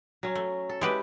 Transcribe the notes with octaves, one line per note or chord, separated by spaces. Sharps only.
F#3 C#4
A3
A4
G#3 E4 G4 B4